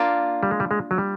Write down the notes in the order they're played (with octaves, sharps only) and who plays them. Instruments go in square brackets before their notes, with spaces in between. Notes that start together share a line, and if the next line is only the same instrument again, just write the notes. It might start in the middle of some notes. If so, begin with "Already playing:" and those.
Already playing: [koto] A#3 D4 F4
[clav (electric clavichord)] G3
G#3
G3
G#3
F#3
G3